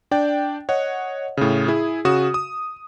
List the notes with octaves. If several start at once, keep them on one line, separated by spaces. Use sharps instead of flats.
D4 D5 G5
C#5 D#5 F#5
A2 C#3
E4 G#4
C#3 F#4 D#6 E7
D#6